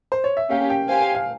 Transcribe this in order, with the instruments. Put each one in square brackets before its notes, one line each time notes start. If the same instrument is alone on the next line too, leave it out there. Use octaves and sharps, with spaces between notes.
[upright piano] C5
C#5
E5
[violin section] A#3 C#4 G4 [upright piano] F5
[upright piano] G5
[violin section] G4 C5 F5 G#5
[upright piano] F5